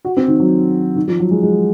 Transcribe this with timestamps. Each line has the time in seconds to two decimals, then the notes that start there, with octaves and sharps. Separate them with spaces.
0.05 F#4
0.17 C4
0.28 D#3
0.40 F#3
0.96 D#3
1.08 F3
1.20 F#3
1.31 G#3
1.42 G#3